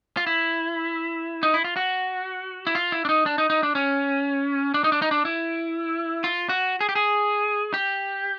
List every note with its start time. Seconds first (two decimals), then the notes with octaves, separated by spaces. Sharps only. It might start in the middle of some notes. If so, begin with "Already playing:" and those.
0.17 F4
0.27 E4
1.43 D#4
1.54 E4
1.64 F4
1.76 F#4
2.67 E4
2.75 F4
2.92 E4
3.05 D4
3.09 D#4
3.26 D4
3.38 D#4
3.50 D#4
3.63 D4
3.75 C#4
4.74 D4
4.84 D#4
4.92 D4
5.02 D#4
5.11 D4
5.25 E4
6.24 F4
6.49 F#4
6.81 G#4
6.89 G4
6.96 G#4
7.74 G4